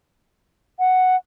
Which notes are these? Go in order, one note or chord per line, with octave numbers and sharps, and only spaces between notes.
F#5